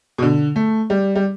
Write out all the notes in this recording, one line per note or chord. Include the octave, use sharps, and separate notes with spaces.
B2
D3
A3
G3
G3